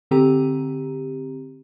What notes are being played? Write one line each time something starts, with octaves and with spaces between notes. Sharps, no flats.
D3 C4 G4 A#5 D#7